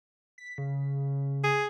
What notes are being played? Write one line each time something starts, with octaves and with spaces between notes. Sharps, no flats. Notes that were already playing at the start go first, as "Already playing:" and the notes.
B6
C#3
G#4